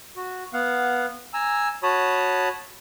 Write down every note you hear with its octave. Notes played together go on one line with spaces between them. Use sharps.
F#4
B3 F5 F#5
G#5 A#5 E6
F#4 C#5 A5 B5 D#6